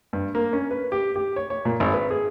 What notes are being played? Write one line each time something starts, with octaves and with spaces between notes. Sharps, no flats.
G2
A#3
C#4
B4
G4
G4
C#5
C#5
A#2
G#1
B4
G#4